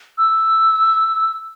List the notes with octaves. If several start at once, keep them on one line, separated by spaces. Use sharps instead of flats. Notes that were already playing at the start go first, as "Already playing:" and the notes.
E6